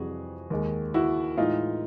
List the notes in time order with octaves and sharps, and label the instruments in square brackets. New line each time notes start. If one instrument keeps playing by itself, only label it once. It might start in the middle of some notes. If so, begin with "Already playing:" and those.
Already playing: [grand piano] F2 C3 E3 G3 F#4 G#4
D#2 D#3 G#3
E4 F#4
A2 E3 G#3 D#4 F4